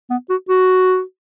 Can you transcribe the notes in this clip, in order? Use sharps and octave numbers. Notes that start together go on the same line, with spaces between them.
B3
F#4
F#4